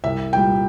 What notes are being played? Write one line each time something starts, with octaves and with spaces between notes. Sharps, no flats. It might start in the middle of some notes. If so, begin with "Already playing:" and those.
C2 E5
A#2 G3 G5